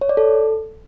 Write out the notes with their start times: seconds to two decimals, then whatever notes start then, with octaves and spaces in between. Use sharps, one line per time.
0.01 C#5
0.09 D5
0.17 A4